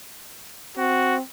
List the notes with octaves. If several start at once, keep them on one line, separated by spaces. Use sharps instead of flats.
C4 F#4